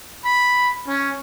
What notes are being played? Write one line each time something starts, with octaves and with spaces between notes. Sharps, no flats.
B5
C#4